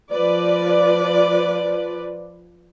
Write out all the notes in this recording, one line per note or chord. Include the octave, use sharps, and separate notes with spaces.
F3 B4 D5